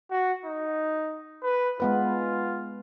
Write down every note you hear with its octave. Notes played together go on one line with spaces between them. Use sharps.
F#4
D#4
B4
G#3 B3 F4 B4